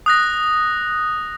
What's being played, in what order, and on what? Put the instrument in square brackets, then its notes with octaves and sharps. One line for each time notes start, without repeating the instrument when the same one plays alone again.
[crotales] D#6 F#6 A#6